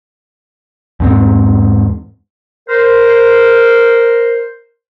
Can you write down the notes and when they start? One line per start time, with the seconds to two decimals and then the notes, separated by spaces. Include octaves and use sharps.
1.00 E2 G#2 C4
2.69 A#4 C5